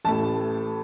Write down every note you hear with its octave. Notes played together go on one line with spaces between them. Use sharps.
A1 A2 A3 A5